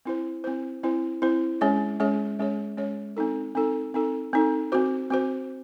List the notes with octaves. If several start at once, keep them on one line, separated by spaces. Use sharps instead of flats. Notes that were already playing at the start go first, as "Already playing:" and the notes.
C4 E4 C5
C4 E4 C5
C4 E4 C5
C4 E4 C5
G#3 C#4 G#4 C#5
G#3 C#4 G#4 C#5
G#3 C#4 G#4 C#5
G#3 C#4 G#4 C#5
C4 D#4 A4
C4 D#4 A4
C4 D#4 A4
C4 D#4 A4
C4 F#4 C5
C4 F#4 C5